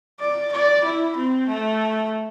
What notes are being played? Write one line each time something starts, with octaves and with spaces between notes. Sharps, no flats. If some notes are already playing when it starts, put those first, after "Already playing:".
D5
D5
E4
C4
A3